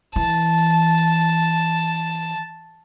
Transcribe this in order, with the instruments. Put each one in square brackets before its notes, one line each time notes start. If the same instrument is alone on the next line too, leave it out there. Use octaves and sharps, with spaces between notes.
[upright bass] E3 [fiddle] A5